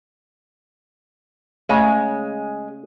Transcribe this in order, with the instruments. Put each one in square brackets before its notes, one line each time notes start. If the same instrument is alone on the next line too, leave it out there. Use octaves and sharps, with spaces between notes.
[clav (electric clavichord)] C#3 [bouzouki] G#3 [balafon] A3